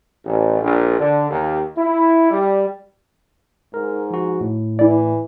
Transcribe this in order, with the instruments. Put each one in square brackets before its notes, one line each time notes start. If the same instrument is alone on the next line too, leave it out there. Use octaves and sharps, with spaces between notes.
[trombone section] A1
A#1
D3
D#2
E4
G3
[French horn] G#2 [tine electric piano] A#4
[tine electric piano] F3 F#4
A2
[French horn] E3 [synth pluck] E4 D5